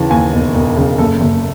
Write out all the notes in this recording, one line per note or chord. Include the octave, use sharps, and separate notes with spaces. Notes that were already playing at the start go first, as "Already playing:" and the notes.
Already playing: D#2 C#3 E3 A5
D#2 G#5
E1
E1
C#3
F#1 A4
F#1